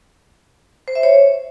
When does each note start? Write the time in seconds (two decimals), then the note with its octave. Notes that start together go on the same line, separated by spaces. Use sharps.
0.88 C5
0.95 E5
1.03 C#5